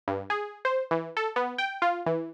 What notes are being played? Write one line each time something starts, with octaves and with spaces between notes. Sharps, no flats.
G2
G#4
C5
E3
A4
B3
G5
F4
E3